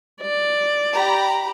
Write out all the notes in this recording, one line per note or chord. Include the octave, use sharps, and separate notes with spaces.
D5
G4 A#5 B5